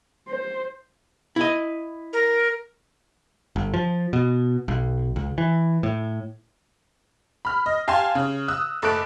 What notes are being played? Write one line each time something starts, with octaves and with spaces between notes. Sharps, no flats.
C5
E4 D#5
A#4
G1
F3
B2
B1
C#2
E3
A2
B5 F6
D#5
G4 F5 G#5 A5 C6
C#3
D#6 E6 F#6
F#1 A3 A5 D6 F#6 D7